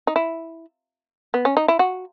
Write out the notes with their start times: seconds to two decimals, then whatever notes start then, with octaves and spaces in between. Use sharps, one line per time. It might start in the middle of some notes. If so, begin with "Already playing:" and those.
0.07 D#4
0.16 E4
1.34 B3
1.45 C#4
1.57 D#4
1.68 E4
1.79 F#4